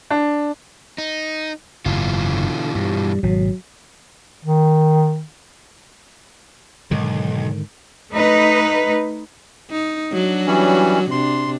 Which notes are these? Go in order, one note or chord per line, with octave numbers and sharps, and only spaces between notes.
D4
D#4
F#1 G#2 B2 E3 F4
D3
G2 G3
G#1 B2 F#3
D#3
B1 G#2 D3 D#3
A3 D#4 B4
D#4
F#3 D4 F#4
E3 G3 C#4
C3 D4 C6